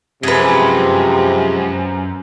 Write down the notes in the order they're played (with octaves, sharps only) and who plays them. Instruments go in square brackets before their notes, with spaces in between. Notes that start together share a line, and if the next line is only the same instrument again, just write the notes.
[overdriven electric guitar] F#2 [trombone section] C3 [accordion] F3 G#3 [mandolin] G#4 B4